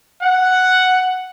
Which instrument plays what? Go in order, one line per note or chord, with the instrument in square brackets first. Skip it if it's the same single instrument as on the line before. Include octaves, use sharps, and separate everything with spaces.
[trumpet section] F#5